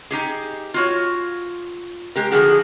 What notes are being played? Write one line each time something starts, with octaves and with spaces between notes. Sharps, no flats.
D#4 G4 G#4
F4 F#4 C#5
G#3 G4 A#4
D3 F3 F#4 G#4